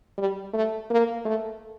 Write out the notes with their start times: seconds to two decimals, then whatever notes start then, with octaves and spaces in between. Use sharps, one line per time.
0.18 G3
0.53 A3
0.90 A#3
1.25 A3